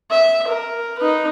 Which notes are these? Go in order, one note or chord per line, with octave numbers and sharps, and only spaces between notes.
E5
A#4
D#4 B4